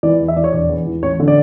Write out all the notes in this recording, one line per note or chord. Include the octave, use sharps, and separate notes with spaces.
E3 D5
E2
E5
E3 D5
C#5
E1 D5
E2
E3
A1 C#5
D3
D5